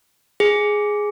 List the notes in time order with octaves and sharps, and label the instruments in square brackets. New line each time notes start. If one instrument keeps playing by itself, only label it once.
[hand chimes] G#4